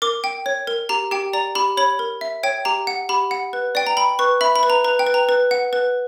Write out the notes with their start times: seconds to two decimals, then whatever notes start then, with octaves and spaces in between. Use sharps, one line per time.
0.02 A#4 D6
0.24 G5
0.46 C#5
0.67 A#4
0.89 G4 A#5
1.11 G4 G5
1.33 D5 A#5
1.55 G4 B5
1.77 C#5 B5
1.99 A#4
2.21 E5
2.43 C#5 G5
2.65 G4 A#5
2.87 F#5
3.09 G4 B5
3.31 F#5
3.53 B4
3.75 D5 G5
3.87 A#5
3.97 G5 B5
4.19 B4 C#6
4.41 E5 B5
4.56 B5
4.63 B4
4.70 A#5
4.84 B4 A#5
4.99 G5
5.07 B4
5.14 A#5
5.29 B4
5.51 F#5
5.73 B4